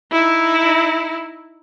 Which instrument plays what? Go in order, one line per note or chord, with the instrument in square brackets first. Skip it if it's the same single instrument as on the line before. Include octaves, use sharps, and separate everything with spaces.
[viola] D#4 E4